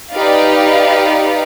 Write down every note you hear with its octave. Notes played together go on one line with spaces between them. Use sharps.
D#4 G4 B4 D5 F5